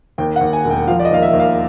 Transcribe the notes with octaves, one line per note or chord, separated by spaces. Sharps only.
D#2 G5
F#5
D#2
G#5
E1
G5
F3 F5
D5
D#5
D#2 F5
E5
D#2
F5